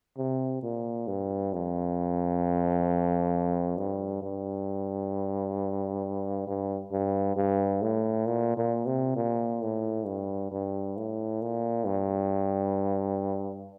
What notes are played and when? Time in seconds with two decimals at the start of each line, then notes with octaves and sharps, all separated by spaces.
0.18 C3
0.63 A#2
1.08 G2
1.53 F2
3.77 G2
4.22 G2
6.48 G2
6.92 G2
7.37 G2
7.82 A2
8.26 A#2
8.57 A#2
8.86 C3
9.16 A#2
9.62 A2
10.06 G2
10.52 G2
10.97 A2
11.42 A#2
11.86 G2